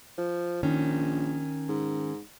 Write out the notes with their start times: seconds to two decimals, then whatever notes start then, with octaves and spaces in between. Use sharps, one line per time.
0.18 F3
0.63 A#1 D#3 C#4
1.69 G#2